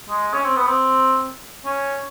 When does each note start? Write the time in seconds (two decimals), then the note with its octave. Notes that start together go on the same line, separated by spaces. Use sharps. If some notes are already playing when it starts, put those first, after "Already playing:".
0.09 G#3
0.34 C#4
0.44 C4
0.56 B3
0.67 C4
1.65 C#4